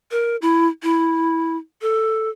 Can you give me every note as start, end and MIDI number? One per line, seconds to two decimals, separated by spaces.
0.11 0.36 70
0.42 0.67 64
0.83 1.56 64
1.82 2.29 69